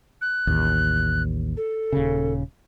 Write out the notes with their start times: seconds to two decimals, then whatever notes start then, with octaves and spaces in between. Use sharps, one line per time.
0.21 F#6
0.47 A1 D#2
1.57 A4
1.93 D#1 C#3